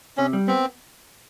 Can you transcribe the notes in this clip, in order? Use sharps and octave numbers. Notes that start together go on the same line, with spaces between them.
C3 C#4
G3
B3 C4